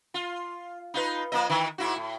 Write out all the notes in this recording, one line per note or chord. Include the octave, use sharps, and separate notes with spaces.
F4
D#4 F4 B4
F3 A#3 D#5
D#3 E3
G#2 E4 F#4
A2